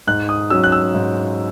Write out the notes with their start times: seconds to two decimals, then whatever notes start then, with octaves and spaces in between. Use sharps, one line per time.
0.07 G#2 F#6
0.29 D#6
0.50 F#3 C#4 E6
0.64 F#6
0.72 E6
0.95 G#2